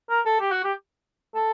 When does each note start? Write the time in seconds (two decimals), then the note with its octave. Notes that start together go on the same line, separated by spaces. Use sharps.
0.10 A#4
0.26 A4
0.40 G4
0.52 F#4
0.64 G4
1.35 A4